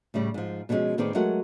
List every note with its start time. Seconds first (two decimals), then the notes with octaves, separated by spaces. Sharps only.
0.14 A2 C#3 G3
0.34 G#2 F3
0.69 B2 D3 F3 G3 G#3 C#4
0.98 A2 D#3 B3 C4 G#4 D5
1.15 F#3 G#3 A3 A#4 F#5